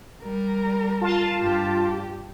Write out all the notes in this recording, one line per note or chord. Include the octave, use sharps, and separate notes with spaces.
G3 A#4
F4 A5
G2 G4